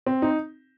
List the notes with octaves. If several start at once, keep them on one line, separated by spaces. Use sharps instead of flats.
C4
D#4